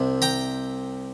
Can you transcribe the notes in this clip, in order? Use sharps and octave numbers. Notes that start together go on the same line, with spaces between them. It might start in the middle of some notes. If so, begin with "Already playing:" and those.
Already playing: C2 C3 C4
G5 A#5